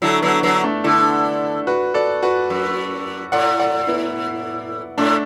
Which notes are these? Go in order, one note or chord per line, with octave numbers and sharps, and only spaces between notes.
D3 F#3 E4 A4
D3 F#3 B3
D3 F#3 B3
A3 D4
D3 E4 A4
F#4 B4
A4 D5
F#4 B4
F#2
A2 D5 F#5
D5 F#5
B3 E4
A2 A3 D4